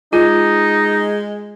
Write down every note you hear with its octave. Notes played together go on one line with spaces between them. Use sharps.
G#3 D#4 F4